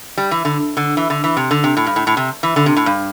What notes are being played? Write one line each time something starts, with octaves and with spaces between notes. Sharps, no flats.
G3
E3
D3
D3
E3
D3
E3
C3
D3
C3
A2
G2
A2
A2
C3
E3
D3
C3
A2
G2